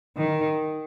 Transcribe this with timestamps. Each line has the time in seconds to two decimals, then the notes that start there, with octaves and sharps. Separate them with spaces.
0.17 D#3